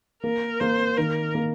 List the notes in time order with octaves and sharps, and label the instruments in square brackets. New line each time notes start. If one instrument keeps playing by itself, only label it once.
[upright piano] A#3 [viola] A#4
[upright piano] A#3 [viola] C5
[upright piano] D#3 [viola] A#4
[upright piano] A#3